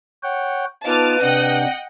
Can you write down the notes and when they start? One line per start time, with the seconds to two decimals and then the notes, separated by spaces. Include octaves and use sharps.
0.23 C#5 F#5 G5
0.85 B3 D#4 F4 B4 A5 D6 F6
1.22 C3 D4 D#5 F#5 G5